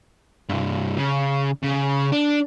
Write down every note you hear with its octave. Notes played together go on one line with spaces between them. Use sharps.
C2 G2
C#3
C#3
D4